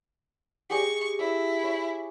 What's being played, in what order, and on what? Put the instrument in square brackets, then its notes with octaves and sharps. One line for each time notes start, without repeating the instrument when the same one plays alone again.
[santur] G4 G#4 D#5 [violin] C#6
[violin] E4 [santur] E6
[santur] C#5